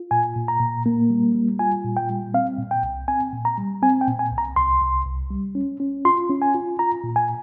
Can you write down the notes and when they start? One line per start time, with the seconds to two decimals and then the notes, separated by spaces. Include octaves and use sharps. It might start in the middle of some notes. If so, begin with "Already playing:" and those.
Already playing: F4
0.11 A#2 G#5
0.36 A#2
0.48 A#5
0.60 A#2
0.86 A#3
1.10 G3
1.35 G3
1.59 F4 G#5
1.84 A#2
1.97 G5
2.10 G3
2.34 C4 F5
2.58 A#2
2.71 G5
2.83 C2
3.08 C4 G#5
3.33 A#2
3.45 A#5
3.58 G3
3.82 C4 G#5
4.01 G5
4.07 A#2
4.19 G#5
4.32 C2
4.38 A#5
4.56 C2 C6
4.81 C2
5.06 C2
5.30 G3
5.55 C#4
5.80 C#4
6.05 F4 C6
6.30 C#4
6.42 G#5
6.55 F4
6.79 F4 A#5
7.04 A#2
7.16 G#5